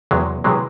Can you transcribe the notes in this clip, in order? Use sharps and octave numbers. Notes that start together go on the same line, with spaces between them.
E2 C3 E3 F#3 G#3
C3 E3 F#3 G#3